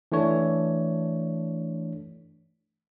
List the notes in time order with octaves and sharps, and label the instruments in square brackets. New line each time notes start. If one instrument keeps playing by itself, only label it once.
[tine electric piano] E3 A3 D4 C#5